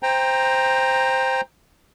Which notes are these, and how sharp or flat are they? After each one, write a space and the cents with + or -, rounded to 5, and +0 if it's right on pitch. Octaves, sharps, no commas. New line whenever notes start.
C5 +0 G5 +20 A#5 +0